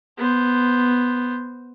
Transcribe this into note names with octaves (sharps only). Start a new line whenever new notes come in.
B3 C5